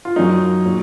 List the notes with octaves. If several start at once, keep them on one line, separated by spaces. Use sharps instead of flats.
F4
F#2 D#3 F#3 D#4
A#2 F#3